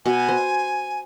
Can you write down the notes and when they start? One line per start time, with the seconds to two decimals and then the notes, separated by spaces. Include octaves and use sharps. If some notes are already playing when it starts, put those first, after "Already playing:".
0.06 B2 G#5
0.29 C5